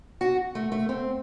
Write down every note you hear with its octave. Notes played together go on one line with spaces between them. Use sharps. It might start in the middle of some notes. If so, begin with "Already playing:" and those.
F#4
A3
A3
C4